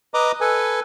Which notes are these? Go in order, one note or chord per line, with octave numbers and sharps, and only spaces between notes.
B4 D#5 A#5 D6
A4 B4 G#5